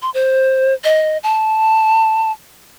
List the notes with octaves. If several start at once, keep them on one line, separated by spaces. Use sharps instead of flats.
C6
C5
D#5
A5